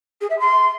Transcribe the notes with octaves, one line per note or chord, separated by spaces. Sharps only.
G#4
E5
C6